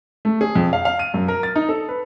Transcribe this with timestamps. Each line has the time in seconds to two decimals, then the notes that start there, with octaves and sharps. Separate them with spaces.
0.25 A3
0.41 G#4
0.55 F2
0.73 F5
0.85 F5
0.99 D#7
1.14 F#2
1.28 A#4
1.43 A6
1.56 D#4
1.69 A4
1.89 B4